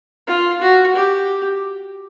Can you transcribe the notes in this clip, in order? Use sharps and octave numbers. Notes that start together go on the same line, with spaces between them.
F4
F#4
G4